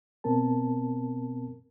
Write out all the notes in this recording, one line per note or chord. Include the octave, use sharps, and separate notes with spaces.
B2 B3 C4 A#4 A5